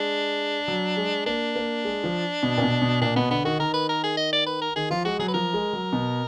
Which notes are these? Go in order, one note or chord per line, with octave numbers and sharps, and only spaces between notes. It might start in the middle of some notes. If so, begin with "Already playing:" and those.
Already playing: G#3 D4
F#3
G#3
A#3 D4
A#3
G#3
F3
B2
A#2
B2
B2
A#2 D4
B2 B3
D3 B3
D#3 F#4
D#3 A#4
B4
A#4
G#4
D#5
D5
B4
A#4
D#3 G#4
F3 F4
G#3 F#4
F#3 G#4
B4
F3 A#4
G#3
F#3
B2